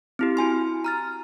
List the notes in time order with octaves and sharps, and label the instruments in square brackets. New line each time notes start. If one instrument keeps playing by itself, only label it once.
[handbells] C4 E4 G4
E4 F#4 G#5 C6
A#5 F6 A6